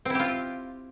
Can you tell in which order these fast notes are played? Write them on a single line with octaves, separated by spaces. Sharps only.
C4 E4 G4 F4